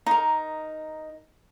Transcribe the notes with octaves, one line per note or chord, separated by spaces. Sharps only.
D#4 A#4